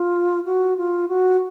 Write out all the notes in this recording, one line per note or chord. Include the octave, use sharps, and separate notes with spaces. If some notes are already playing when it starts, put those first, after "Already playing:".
Already playing: F4
F#4
F4
F#4